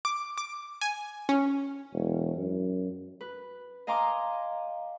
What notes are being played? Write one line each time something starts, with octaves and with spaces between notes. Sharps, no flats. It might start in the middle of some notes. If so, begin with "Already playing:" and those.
D6
D6
G#5
C#4
E1
F#2
B4
D#5 F5 G#5 A#5 C6 D6